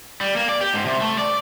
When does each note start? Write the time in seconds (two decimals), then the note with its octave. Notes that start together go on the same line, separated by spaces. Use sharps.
0.21 G3
0.36 A#3
0.49 D5
0.61 G4
0.73 G#2
0.86 C3
1.01 A3
1.18 D5